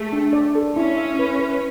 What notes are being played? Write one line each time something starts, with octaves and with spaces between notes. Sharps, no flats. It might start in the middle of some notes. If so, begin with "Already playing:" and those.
Already playing: A3 G#4
D4
D5
A4
C#4 E4
E5
B4
B4